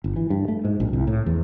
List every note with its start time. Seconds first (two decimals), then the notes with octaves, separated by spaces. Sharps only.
0.04 G1
0.16 E3
0.30 G2
0.48 A3
0.64 G#2
0.80 A#1
0.93 C2
1.07 A2
1.26 E2